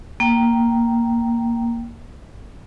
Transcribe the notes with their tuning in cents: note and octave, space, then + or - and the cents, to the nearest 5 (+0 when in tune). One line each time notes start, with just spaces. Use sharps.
A#3 +0 G5 -10